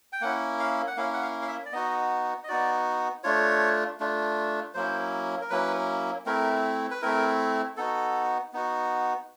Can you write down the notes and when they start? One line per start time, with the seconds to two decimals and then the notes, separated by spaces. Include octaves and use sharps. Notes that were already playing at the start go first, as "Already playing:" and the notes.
0.13 G5
0.21 A#3 C#4 E4 F#5
0.60 F5
0.87 F#5
0.97 A#3 C#4 E4 F5
1.13 F#5
1.22 F5
1.42 F5
1.48 E5
1.66 D5
1.72 B3 D#4 F#4 D#5
2.44 D#5
2.48 B3 D#4 F#4 D5
3.24 A3 D4 F4 C#5
4.00 A3 D4 F4
4.74 F#3 A#3 C#4 E4 C5
5.41 A#4
5.50 F#3 A#3 C#4 E4 B4
6.26 A3 C4 E4 A#4
6.91 B4
7.02 A3 C4 E4 A#4
7.77 B3 D#4 F#4 A4
8.53 B3 D#4 F#4